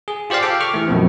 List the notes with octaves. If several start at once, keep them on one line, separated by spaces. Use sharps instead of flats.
G#4
F4 G4 C5 D5 F5
G4 A4 G5
C#6 D6 F6
E3 A3
F#2 B2 F3 C4